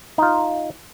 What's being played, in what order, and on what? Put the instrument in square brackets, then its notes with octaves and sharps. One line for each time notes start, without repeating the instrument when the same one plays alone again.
[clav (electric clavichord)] D#4 F4